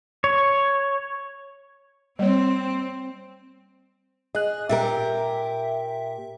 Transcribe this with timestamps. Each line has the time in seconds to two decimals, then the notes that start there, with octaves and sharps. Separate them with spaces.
0.24 C#5
2.19 G3 A#3 C4 C#5
4.35 G#4 D#5 F#6
4.69 A#2 G4 A#4 E5